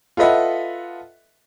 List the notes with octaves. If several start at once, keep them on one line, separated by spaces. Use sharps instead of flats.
F4 A4 B4 D#5 E5 F#5